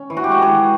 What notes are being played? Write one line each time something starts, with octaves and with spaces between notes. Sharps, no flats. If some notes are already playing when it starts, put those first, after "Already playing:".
Already playing: C#4
E3
F#4
G4
G#3 F#4
G#4
E3